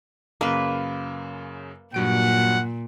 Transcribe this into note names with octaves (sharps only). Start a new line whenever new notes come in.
F#2 C#3 A#3 B4
G2 A#2 F#3 F#5 D7